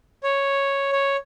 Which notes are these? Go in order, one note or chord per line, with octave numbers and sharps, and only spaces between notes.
C#5
C#5